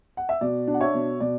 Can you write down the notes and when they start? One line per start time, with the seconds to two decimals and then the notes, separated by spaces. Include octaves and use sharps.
0.17 F#5
0.29 E5
0.41 B2 D5
0.67 D4
0.74 F#5
0.81 C#5 E5
0.94 B2
1.20 B2 D5